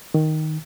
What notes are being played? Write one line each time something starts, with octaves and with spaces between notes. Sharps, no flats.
D#3